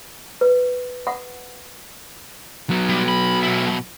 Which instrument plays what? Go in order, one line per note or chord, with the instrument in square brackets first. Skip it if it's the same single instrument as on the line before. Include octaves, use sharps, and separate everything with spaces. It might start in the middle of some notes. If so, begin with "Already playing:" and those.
[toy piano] B4
F#5
[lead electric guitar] F#3 B3
[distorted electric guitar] G3
B5
B2 E4